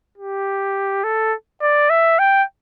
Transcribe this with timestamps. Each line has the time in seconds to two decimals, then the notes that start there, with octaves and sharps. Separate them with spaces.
0.17 G4
1.04 A4
1.62 D5
1.90 E5
2.19 G5